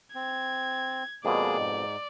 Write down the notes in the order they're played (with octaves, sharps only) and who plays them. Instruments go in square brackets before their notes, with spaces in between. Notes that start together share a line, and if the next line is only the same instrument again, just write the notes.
[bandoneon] C4 [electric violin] G#6
[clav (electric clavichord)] F2 B2 [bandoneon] G#3 A#3 G#4 [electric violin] D5
[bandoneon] G#2